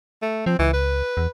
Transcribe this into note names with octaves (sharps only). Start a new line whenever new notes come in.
A3
F3 C4
C#2 E3
B4
E2